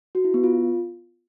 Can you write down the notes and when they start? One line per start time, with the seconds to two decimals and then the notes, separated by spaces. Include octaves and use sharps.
0.15 F#4
0.24 E4
0.34 B3
0.44 F4